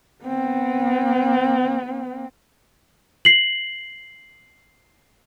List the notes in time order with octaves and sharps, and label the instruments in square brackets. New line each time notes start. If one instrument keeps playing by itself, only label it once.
[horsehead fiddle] B3 C4
[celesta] C7 F#7